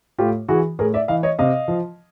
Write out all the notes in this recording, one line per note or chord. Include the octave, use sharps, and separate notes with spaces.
A2 F4 G4
E3 F#4 G#4
A2 G#4 A#4
D5 E5
E3 D#5 F5
C#5 D#5
C3 D#5 F5
F3